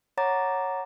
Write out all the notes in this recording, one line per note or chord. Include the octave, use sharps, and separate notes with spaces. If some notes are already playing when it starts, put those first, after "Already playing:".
C#5 F#5 A#5 D6 A6